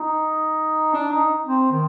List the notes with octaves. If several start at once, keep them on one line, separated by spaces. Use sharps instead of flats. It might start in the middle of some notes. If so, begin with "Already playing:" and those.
Already playing: D#4
D4
D#4
C4
D#3